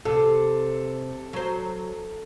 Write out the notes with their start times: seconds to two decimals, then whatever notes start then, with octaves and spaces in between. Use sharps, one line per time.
0.05 C3 A4
1.33 F#3 C5